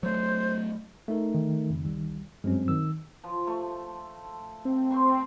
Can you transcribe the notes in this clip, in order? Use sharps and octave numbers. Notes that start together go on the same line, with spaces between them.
F#3 A3 C5
A3 D#4 A#4
D#3
F2 C#3
C2 G3
G2 F#3 G#3 C4 C#4
D#3 E6
F3
A3 C#6
C4
C5 C6 C#6